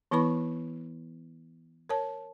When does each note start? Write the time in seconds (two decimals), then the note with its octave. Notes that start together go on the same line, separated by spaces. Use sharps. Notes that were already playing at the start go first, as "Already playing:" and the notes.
0.11 E3 B3 E4 B4 B5 C#6
1.89 A#4 C#5 A5